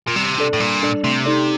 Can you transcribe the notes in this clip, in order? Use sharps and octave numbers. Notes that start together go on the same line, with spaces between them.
A#2
C3 G3
D4 A4 D5
A2
A#2 G3
D4 A4 D5
C3 A3
D#4 A4 D5